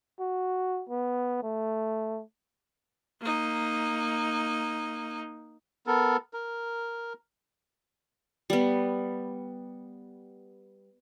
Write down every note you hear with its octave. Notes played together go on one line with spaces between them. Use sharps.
F#4
B3
A3
A#3 D#4
B3 A4 A#4
A#4
G3 B3